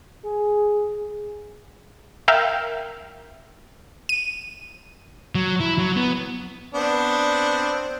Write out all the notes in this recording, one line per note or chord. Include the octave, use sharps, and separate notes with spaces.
G#4
A#4 E5 F5 G5
D#7
F#3
E4
F#3
B3
B3 C4 D4